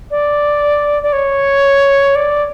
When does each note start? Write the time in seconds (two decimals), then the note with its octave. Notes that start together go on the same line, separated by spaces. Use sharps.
0.11 D5
1.03 D5
1.13 C#5
2.15 D5